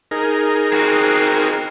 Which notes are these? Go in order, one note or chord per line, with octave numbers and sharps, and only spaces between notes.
D#4 G#4 A#4
C4 F#4